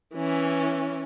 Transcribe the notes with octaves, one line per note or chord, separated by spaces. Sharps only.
E3 C#4